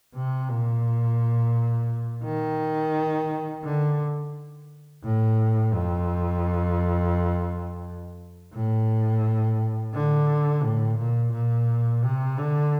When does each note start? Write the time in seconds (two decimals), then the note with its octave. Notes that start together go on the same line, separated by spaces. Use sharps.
0.15 C3
0.50 A#2
2.24 D#3
3.64 D3
5.04 A2
5.74 F2
8.54 A2
9.94 D3
10.63 A2
10.98 A#2
11.33 A#2
12.03 C3
12.38 D3